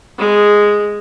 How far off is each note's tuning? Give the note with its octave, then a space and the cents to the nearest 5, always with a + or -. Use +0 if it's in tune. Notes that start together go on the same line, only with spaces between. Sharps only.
G#3 -5